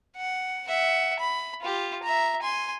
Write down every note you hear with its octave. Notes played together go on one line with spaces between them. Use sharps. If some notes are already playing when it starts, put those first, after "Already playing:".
F#5
E5 F#5
B5
F4 G4
E5 A#5
G#5 C6